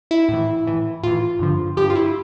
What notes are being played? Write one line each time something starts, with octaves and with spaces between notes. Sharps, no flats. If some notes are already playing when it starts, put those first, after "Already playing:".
E4
A2 E3
A2 E3
A2 E3 F4
G2 D3 F3
G2 D3 F3 G4
F4
E4